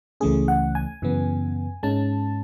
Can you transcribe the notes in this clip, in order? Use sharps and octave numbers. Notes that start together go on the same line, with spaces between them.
C#2 C#3 E3 A3 C#4 G#4
F#5
G#5
F#2 C#3 E3 B3
G#2 G#3 C#4 A5